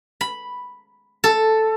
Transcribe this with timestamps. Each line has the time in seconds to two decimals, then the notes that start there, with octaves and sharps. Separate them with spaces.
0.21 B5
1.24 A4